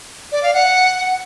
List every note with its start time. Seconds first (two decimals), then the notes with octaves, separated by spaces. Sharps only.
0.32 D5
0.43 F5
0.54 F#5